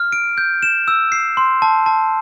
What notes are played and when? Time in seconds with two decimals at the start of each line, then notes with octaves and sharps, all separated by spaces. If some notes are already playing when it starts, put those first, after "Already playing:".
Already playing: F6
0.12 D7
0.38 G6
0.63 E7
0.88 E6
1.12 C7
1.37 C6
1.62 A5
1.86 A5